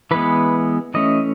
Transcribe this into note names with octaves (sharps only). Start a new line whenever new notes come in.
E3 G#3 B3 B4
E3 A3 C#4 D#5